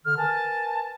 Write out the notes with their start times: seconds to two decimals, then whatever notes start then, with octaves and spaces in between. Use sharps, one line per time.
0.05 D3 F6
0.17 A#4 B4 G#5 A5